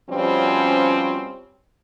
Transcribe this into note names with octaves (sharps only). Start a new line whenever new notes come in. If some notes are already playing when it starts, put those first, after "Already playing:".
B2 F3 G3 C4 C#4